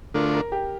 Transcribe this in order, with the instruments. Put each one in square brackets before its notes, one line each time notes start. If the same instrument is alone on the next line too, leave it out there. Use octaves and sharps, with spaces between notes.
[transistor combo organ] D3 A3 D4 F4 [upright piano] A#4
[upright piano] A#4
G4